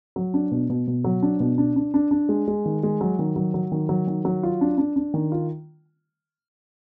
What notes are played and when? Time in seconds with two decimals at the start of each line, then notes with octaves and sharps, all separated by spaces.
0.16 F#3
0.34 D4
0.51 B2
0.70 B2
0.87 B2
1.04 F#3
1.22 D4
1.40 B2
1.58 D4
1.76 D4
1.94 D4
2.11 D4
2.29 G#3
2.48 G#3
2.66 D#3
2.83 G#3
3.01 F#3
3.19 D#3
3.36 F#3
3.54 F#3
3.72 D#3
3.89 F#3
4.07 D#3
4.25 F#3
4.43 F4
4.61 D4
4.78 D4
4.96 D4
5.14 D#3
5.32 F4